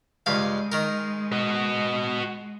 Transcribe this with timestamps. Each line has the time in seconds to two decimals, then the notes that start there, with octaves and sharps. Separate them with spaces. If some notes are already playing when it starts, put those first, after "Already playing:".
0.26 C#2 G2 G#3 F5
0.72 D#3 A#4
1.32 F#4 D#5